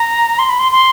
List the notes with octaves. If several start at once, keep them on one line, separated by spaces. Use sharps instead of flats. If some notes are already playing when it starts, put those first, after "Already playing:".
Already playing: A#5
C6
B5
C6
C6